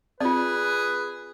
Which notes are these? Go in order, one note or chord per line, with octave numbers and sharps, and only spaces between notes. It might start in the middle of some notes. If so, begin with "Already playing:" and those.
C4 F4 G#4 B4 D5